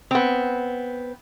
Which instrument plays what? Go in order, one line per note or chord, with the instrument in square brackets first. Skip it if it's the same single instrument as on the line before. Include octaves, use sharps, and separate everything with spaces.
[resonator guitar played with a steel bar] B3 C4